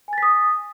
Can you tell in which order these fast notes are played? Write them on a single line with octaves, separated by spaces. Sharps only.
G#5 A6 B6 D#6